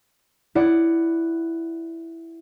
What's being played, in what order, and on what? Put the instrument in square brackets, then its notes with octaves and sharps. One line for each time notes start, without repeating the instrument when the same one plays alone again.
[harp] E4 D5 F#5